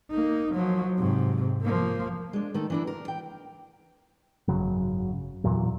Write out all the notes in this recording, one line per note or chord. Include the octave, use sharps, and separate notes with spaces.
A#3 D#4
F3 F#3
G#2 C3
F3 A#3
G#3 D4
D#3 A3 A4
E3 D4 E4
A#4
G5
G#1 F#2 C#3 F#3
E2 A#2 E3 F#3